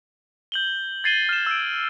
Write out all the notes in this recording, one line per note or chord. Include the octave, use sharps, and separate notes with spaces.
G6 F#7 G7
G#6 A6 C7 D#7 F#7 G7
F6 E7
E6 D7